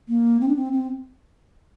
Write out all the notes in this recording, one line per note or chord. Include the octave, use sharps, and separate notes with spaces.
A#3
C4
D4
C4
C4